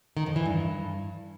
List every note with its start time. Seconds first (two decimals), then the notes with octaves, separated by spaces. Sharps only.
0.17 D#3
0.26 F2
0.36 E3
0.46 G2